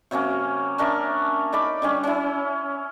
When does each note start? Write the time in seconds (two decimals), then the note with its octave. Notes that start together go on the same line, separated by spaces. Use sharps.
0.11 C3 F#3 A#3 C#4
0.78 C#4 D4 A#4 E5
1.52 D#4 D5 B5 D6
1.82 D3 G3 C#4
2.04 C#4 E4